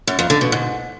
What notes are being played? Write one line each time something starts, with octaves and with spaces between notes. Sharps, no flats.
F#2
F2
D3
B2
G#2